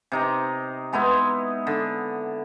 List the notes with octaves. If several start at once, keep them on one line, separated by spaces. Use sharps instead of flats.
C3 D#4 A#5
G#3 B3 D#4 E4
D3